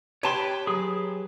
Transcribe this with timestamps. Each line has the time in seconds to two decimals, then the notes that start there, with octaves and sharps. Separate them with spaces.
0.23 G4 B4 C#5 A5 C6
0.67 F#3 G#4